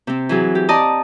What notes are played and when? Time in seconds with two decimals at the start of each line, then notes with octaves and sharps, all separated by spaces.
0.07 C3 C4
0.29 E3 F#3 G#4
0.55 G4
0.69 D5 D#5 A5 A#5 D6 D#6